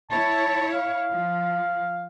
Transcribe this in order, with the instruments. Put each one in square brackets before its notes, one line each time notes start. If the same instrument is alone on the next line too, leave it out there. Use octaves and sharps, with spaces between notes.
[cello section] E4 C#5 [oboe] A5
[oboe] F5
[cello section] F3